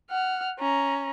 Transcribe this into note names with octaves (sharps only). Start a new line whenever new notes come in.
F#5 F6
C#4 A#5